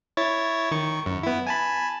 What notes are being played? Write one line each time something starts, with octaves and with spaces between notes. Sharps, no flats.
E4 C#5 A6
D#3 C#6
F#2
B3 E4
G#5 A5 B5